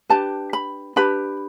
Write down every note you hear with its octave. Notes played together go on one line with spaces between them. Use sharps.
D4 G4 B4 A5
B5
D4 G4 B4 B5